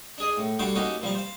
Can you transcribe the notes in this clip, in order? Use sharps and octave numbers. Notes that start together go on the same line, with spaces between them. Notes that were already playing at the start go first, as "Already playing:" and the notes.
D4 G#4 D#5
A2
D3 G3 F#4 G4 G5 C6
A#3 C#4 D#4 F#4 G4
A#2 F3 G3 F5
C5 F5